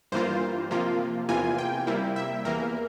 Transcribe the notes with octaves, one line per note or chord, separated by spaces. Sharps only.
G2 E3 A#3 F4 C5
C3 F3 A#3 F4
E2 C3 E3 A#3 F4 G#5
G5
C3 G3 A#3 E4
E5
E2 E3 A#3 A#4